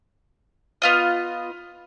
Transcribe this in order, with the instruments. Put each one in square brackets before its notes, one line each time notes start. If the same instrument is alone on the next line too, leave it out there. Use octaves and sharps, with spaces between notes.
[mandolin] B3 F4 D#5